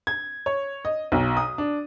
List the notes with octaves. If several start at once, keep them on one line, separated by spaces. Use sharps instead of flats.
G#6
C#5
D#5
B1
D#6
D4